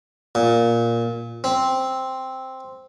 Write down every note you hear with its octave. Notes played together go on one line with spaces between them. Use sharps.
A#2
C4